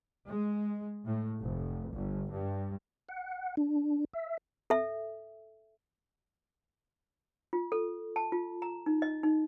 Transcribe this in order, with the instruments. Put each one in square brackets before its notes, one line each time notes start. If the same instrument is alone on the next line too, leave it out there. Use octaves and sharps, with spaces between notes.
[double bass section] G#3
A2
F1
G1
G2
[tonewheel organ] F#5
D4
E5
[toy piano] A4 E5
F4
A4
A5
F4
A#5
D#4
D#5
D#4